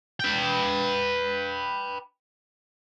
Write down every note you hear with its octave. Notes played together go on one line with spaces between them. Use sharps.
B4 G5